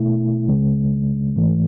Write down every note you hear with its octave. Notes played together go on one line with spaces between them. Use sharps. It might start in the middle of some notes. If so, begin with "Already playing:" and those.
Already playing: B2 A3 E4
C#2 C#3 G#3
G#2 E3 A3